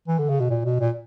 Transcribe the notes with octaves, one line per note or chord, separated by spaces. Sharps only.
E3
D3
C#3
B2
A#2
B2
A#2